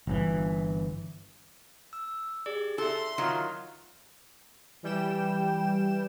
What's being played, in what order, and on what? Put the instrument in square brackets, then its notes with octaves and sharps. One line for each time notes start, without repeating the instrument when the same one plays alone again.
[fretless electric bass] G1 E3
[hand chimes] E6
G4 G#4 D5
[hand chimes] E4 E5 [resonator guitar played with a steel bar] A4 [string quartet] C6
[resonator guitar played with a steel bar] D#3 F#3 F4
[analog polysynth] E3 G3 G5 E7